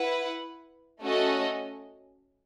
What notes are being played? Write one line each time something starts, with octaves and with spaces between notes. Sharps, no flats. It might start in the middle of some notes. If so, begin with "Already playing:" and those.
Already playing: E4 B4 F#5
A3 C#4 F#4 A4 D#5